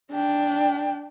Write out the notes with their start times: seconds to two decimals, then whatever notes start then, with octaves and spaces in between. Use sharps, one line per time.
0.12 D4 G5